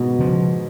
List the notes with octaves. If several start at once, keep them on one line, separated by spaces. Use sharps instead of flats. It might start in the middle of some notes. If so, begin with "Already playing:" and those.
Already playing: G#2 B2
C#3 F3